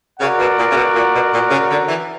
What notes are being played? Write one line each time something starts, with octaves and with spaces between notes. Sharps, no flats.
C#3 F#4 A#4 D5 F#5
B2
A#2
C#3
B2
A#2
B2
A#2
C#3
D3
E3